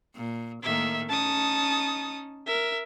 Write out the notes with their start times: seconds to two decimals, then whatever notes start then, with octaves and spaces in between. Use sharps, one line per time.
0.15 A#2
0.63 A2 D#3 A#3 E5
1.10 C#4 D#4 A5 D#6
2.47 A#4 E5